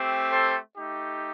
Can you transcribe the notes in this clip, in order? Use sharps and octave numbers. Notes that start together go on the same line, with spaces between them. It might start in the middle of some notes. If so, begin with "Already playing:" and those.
Already playing: A3 C4 G4
A4 C5
A3 D#4 G4